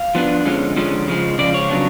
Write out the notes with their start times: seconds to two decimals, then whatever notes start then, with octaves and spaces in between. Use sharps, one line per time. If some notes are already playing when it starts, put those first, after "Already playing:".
Already playing: F5
0.15 F3 B3 D4
0.45 D3 F3 G#3 C#4
0.76 D3 F3 G#3 C#4
1.08 C#3 F3 G#3
1.38 C#3 F3 G#3 D5
1.54 C#5
1.69 C#3 F#3 B3 D4